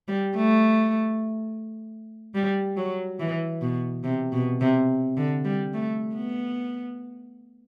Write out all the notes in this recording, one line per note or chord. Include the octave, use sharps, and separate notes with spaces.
G3
A3
G3
F#3
E3
B2
C3
B2
C3
D3
G3
A3
B3